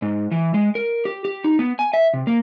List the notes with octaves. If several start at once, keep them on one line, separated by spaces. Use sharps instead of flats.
G#2
E3
G#3
A#4
G4
G4
D#4
B3
G#5
E5
C3
A#3